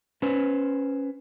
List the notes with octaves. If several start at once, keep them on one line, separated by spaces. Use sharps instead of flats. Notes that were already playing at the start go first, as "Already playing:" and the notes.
C#4 B4 C5